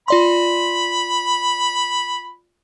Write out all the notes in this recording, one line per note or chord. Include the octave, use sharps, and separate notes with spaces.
F4 D5 B5 C6